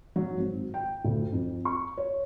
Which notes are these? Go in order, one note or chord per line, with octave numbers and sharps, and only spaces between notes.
F#3
G#1
G5
D2
F2
C#6
C#5